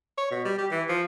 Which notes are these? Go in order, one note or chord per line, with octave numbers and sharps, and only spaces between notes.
C#5
B2
G3
G4
E3
F3